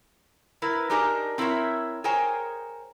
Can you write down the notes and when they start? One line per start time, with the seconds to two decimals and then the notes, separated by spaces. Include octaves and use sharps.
0.62 E4 A#4 B4
0.90 D4 D#4 G4 G#4 A#4 D#5
1.38 C4 E4 A#4 B4 C#5 E5
2.04 G#4 A#4 C5 C#5 G5 G#5